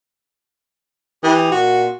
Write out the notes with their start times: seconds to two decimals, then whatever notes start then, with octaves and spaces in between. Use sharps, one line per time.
1.24 E3 G4 D#6
1.52 A#2 F#4